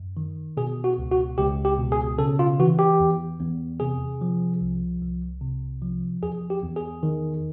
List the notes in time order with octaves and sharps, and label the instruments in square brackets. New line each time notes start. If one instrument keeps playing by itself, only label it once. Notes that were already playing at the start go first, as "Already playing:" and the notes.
Already playing: [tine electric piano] F#2
D#3
B2 G#4
F#4
C#2
F#4
C#2 G4
G4
B2
G#4
C#3 A4
F4
E3 F#4
G4
E2
E2
C3 G#4
F3
C2
C2
C3
F3
E2 G#4
G4
E2
G#4
D#3